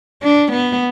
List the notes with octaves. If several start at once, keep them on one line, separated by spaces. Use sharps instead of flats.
D4
B3